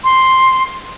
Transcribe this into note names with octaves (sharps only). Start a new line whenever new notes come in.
C6